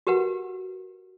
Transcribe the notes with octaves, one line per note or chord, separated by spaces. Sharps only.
F#4 G4 A#4 B4 F#5